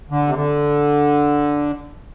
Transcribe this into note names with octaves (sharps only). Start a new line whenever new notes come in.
D3
C3
D3